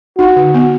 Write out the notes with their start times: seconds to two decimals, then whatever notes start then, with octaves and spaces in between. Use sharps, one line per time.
0.18 D#4 F#4
0.36 D3
0.54 B3